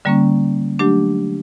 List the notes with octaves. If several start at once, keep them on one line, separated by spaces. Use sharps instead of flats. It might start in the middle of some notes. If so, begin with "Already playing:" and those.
D3 G3 A#3 C#4
F#3 A3 D4 G4